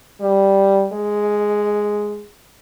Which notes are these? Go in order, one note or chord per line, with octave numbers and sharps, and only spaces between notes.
G3
G#3